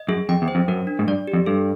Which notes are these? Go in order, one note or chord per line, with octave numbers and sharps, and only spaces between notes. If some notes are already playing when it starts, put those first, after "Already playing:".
Already playing: D#5
F#2 G#4
F2 G5
E2
C5
F2
F#2 A#4
D4
G#2
G2 D5
G4
F2
G2 A4